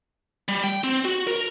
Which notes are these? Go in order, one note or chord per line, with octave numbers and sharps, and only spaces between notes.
G3
G5
C4
F#4
A#4